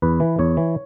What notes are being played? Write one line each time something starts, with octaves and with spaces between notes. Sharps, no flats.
E2 B4
E3
E2 C#5
E3